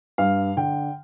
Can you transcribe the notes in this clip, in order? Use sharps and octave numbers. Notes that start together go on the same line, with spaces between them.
G2 F5
D3 G5